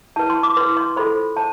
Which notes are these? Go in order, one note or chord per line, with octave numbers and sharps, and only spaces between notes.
E4 B4 A5
C6
D6
E4 B4 C6
C6
F4 A4 C5 B5
C5 A5